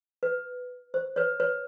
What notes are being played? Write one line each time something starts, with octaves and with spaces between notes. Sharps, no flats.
B4
C5
B4 C#5
B4 C#5